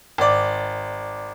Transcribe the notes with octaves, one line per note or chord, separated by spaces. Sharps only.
G#1 D5